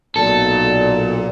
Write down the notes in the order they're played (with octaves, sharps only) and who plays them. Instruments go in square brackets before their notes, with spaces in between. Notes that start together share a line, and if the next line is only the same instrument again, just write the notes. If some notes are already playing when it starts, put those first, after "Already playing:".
[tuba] B1 [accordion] A#2 [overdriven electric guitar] A4